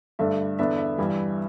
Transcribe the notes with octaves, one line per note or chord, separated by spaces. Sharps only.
G2 D3 A3 D4 E5
E2 D3 B3 D4 E5
E5
G2 E3 G3